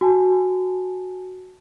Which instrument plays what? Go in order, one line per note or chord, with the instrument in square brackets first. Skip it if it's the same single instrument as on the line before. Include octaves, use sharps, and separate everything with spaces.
[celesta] F#4 G#5 A5